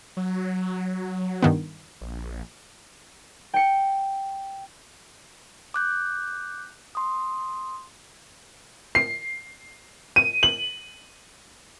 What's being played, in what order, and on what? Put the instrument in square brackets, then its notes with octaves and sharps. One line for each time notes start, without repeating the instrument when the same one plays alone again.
[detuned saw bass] F#3
[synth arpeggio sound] G2 D#3 B3
[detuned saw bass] A#1
[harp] G5 C#7
[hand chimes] D6 F#6 G6
C6 D#6
[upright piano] C7
D#7
F#7